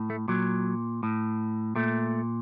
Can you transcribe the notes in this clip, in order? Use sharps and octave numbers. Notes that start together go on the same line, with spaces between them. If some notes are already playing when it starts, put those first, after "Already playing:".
Already playing: A2
A3
A#2 F#3
A2
A#2 A3